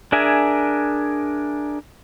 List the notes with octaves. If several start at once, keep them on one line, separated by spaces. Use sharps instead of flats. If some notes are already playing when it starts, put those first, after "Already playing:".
D4 G#4 A#4 E5 G#5